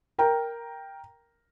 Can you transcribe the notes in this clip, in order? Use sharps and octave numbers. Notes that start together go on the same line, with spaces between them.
A#4 G5 A#5